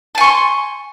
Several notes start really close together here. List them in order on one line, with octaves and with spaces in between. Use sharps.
A5 G#5 C#6 C6